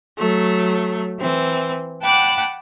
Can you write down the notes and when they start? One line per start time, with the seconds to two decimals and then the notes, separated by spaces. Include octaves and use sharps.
0.17 F#3 A3
1.18 E3 C4
2.01 F#5 G5 A5 B5 D6 F#6